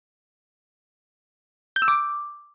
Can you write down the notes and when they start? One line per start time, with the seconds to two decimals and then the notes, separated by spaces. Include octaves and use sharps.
1.76 G6
1.82 E6
1.88 D6